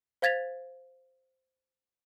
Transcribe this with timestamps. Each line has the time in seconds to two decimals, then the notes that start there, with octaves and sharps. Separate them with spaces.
0.22 C5 F5 G#6 A6 B6 F7